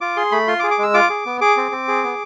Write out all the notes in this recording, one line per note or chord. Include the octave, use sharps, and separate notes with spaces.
F4 D6
G#4 C6
A3 B5
F4 C6
D6
G#4
D6
G#3 E6
F4 D6
G#4
B3
G#4 D6
C4
C4
G#4
B3